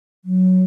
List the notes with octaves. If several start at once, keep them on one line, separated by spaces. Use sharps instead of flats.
F#3